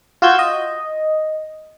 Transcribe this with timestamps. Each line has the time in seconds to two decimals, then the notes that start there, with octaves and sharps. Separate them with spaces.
0.22 F4 F#4 E6 G6 G#6
0.39 D#5